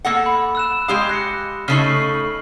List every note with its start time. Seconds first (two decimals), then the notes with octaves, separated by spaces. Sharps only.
0.05 A#3 A4 F#5
0.26 B5
0.55 E6 F#6 E7
0.88 G#3 G4 F5 D#6
1.09 F#6 A#6 C#7
1.68 C#3 A3 D#4 F6 C7 F#7